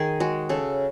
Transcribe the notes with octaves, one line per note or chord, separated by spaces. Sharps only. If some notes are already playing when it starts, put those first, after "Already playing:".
Already playing: D#3 G#4
G#3 F#4
C#3 A4